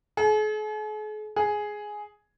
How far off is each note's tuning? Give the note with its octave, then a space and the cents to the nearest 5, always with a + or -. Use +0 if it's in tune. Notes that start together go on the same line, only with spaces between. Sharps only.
G#4 +45
G#4 +5